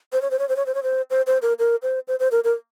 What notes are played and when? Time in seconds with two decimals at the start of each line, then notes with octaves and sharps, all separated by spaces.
0.13 C5
0.22 C#5
0.31 C5
0.39 C#5
0.49 C5
0.56 C#5
0.66 C5
0.75 C#5
0.83 C5
1.11 C5
1.27 C5
1.42 A#4
1.59 A#4
1.83 C5
2.08 C5
2.20 C5
2.32 A#4
2.44 A#4